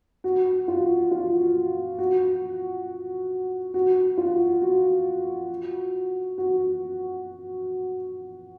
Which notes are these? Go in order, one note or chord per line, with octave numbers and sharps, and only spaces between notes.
F#4
F4
F4
F#4
F#4
F4
F#4
F#4